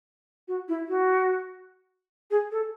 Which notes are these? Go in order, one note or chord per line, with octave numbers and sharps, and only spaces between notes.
F#4
E4
F#4
G#4
A4